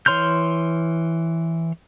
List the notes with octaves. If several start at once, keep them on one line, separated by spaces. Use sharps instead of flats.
E3 C#5 C6 F6 G6